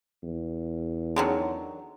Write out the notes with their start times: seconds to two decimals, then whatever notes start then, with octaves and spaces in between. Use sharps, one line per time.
0.23 E2
1.16 D3 D#3 F#3 C#4 D#4 G#4